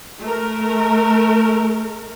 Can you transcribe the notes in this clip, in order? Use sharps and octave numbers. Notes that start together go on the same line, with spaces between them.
A3 A#4